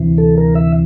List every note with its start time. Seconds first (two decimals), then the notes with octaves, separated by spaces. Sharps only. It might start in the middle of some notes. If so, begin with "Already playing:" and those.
Already playing: D2 C3 E3
0.18 A4
0.37 A#4
0.55 E5